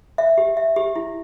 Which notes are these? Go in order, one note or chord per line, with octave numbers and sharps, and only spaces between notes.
E5
G4
E5
G4
E4